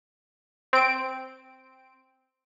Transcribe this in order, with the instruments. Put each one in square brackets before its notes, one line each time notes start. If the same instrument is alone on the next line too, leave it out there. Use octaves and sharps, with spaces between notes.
[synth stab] C4 D7